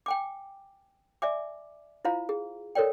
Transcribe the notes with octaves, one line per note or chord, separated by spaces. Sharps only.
G5 G#5 D6
D5 E5 G#5 D6
E4 F4 C5 F5 A#5
G#4
A4 A#4 C#5 D5 G5